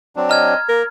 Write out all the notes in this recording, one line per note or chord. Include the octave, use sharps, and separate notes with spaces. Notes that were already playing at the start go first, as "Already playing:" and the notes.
F#3 C4 D4
D#5 A#5 F6 G#6
G#6
A#3 A#4